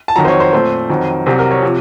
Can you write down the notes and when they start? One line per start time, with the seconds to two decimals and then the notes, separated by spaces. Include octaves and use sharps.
0.08 A5
0.16 F2 D#3 F#3 A#5
0.25 C5
0.28 C#5
0.40 C5
0.53 A#2 A3 C4 C5
0.90 F2 D#3 F#3 C4
1.26 C2 C3 F#3 C4 C5
1.39 A#4
1.51 C#5
1.62 C3 F3